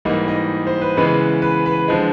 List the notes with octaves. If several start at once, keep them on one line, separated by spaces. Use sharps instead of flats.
G#2 E3 G3 A#3 D#4 D#5
D#4 D#5
C5
B4
C#3 E3 G#3 B3
B4
B4
D3 F3 G#3